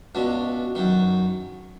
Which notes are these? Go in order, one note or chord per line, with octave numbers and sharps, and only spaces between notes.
C#2 B2 D4
F#2 D#3